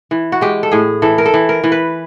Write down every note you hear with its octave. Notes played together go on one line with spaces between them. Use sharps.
E3
F#4
G#3 G4
A4
A2 G#4
E3 A4
A#4
A4
E3
A#4
E3
B4